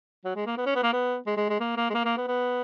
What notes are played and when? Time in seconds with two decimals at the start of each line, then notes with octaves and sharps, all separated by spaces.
0.25 F#3
0.36 G#3
0.46 A#3
0.58 B3
0.66 C#4
0.76 B3
0.83 A#3
0.93 B3
1.27 G#3
1.37 G#3
1.50 G#3
1.60 A#3
1.77 A#3
1.90 G#3
1.94 A#3
2.05 A#3
2.17 B3
2.28 B3